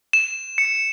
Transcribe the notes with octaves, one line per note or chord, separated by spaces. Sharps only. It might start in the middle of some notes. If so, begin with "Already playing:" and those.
E7
C#7